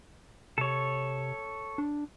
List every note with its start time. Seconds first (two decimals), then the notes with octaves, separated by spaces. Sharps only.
0.58 C3 A4 C#5
1.78 D4